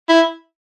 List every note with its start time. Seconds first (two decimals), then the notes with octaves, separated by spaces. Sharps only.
0.08 E4